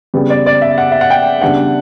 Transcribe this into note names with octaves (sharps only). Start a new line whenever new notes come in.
C#3 G3 B3
D5
D5
E5
F#5
E5
F#5
G5
C#3 G3 B3 D4 F#5